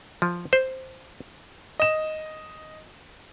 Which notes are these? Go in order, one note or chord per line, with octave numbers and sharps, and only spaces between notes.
F3
C5
D#5 E7